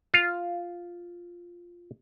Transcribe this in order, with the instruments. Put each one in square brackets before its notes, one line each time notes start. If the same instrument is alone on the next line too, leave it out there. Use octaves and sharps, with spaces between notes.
[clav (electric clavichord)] F4 F5